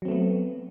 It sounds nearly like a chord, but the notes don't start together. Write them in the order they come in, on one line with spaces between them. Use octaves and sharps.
F#3 C4 A3 B3